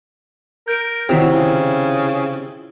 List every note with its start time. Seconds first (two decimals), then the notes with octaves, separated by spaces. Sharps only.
0.68 A#4 G6 D7
1.09 C3 D#3 F#3 E4 F4
1.32 C#3